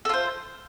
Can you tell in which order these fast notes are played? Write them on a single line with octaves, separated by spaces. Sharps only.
A4 F4 C5